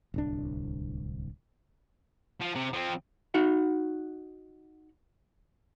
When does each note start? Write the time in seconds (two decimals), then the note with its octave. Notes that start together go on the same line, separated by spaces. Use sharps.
0.14 D1 C2 D4
2.41 F3
2.55 C3
2.73 F3 C4
3.34 D#4 F#4 F#5